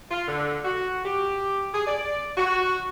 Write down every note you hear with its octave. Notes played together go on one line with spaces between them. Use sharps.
F4
D3
F#4
G4
G#4
D5
F#4